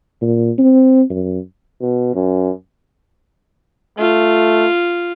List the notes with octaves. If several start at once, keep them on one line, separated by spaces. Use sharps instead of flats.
A#2
C4
F#2
B2
F#2
A3 F4